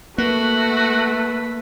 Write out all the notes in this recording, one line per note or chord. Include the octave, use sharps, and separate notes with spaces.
A3 A#3 F#4 B4